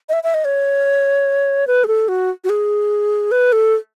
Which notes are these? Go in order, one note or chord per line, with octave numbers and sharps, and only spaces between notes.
D#5
E5
E5
D#5
C#5
B4
G#4
A4
F#4
F#4
G#4
B4
A4